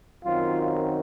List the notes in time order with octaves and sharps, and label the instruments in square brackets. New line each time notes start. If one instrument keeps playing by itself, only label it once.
[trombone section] F#2 D#3 F#3 C4 F4